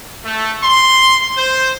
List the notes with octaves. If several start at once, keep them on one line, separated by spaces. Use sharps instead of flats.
A3
C6
C5